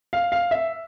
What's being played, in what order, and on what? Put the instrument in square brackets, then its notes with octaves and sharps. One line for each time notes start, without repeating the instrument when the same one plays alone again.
[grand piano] F5
F5
E5